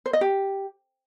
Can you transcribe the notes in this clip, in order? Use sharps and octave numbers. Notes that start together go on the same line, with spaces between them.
C5
D#5
G4